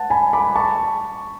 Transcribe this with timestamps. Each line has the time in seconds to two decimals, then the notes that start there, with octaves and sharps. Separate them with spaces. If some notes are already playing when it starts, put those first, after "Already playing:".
Already playing: F#5 A5
0.10 G#5 B5
0.33 B5 D6
0.56 A5 C#6